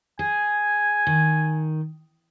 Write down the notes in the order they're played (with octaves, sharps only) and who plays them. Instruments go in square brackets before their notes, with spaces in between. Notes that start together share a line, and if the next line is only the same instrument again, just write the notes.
[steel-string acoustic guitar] G#4 [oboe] G#5
[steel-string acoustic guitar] D#3